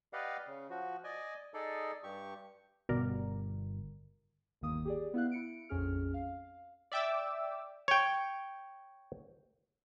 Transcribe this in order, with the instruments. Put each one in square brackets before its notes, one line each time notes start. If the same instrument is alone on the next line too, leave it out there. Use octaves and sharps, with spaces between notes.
[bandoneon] G4 B4 D5 D#5 F5 F#5
C#3
F3 F#4
D5 D#5 G#5
D#4 G#4 A4 D5
G2 G4 C#6
[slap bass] G1 [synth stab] B2 A#4 D5
[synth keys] G1 D#2 D#3 A#3 D#6
G4 G#4 D5
B3 E4 F5 F#6
E4 C#7 D7
A#1 F2 C#4 G#4 F6
F5
[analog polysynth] D5 E5 G5 D6 E6
[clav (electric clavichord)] C#5 G5